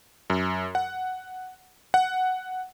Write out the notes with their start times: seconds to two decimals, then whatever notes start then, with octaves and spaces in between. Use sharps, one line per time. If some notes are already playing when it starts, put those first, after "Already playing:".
0.30 F#2
0.75 F#5
1.94 F#5